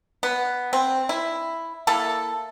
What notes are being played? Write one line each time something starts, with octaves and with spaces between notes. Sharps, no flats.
B3
C4
E4
A#3 E4 A4